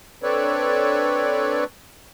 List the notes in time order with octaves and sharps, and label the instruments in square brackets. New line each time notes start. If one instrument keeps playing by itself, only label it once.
[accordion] C4 D4 A4 B4 C#5 D5